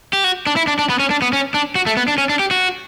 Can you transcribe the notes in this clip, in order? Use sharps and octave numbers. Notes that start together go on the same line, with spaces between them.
G4
F#4
D4
E4
D4
D4
B3
C#4
D4
B3
C#4
D4
F#4
A3
B3
D4
C#4
D4
G4
F#4